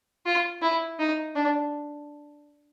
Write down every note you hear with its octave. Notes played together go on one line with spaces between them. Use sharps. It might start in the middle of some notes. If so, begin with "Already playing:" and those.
F4
E4
D#4
D4